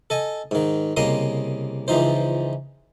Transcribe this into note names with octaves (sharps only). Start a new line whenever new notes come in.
A4 D#5 G#5
G#2 D#3
C2 C#3 A#3 D#5 C6 D#6
C#2 E3 F3 D#4 C5